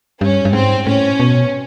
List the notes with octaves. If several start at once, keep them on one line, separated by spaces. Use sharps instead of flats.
G2 C#4
G2
G#2 C4
A2 C#4
B2